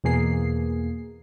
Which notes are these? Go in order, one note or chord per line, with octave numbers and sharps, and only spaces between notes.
E2 B2 A#3 G#4 C7